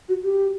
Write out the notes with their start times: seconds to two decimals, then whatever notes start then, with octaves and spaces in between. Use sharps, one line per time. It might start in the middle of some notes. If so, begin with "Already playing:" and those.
0.09 F#4
0.23 G4